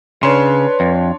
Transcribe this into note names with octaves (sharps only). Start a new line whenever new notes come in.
C#3 D4 B4 C#5 C6
F2